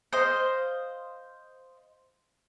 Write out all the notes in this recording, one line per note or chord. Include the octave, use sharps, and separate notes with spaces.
C5 D#5 F5